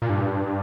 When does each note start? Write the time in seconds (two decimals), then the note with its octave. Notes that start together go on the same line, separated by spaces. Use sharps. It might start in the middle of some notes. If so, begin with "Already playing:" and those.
0.02 A#2
0.09 G2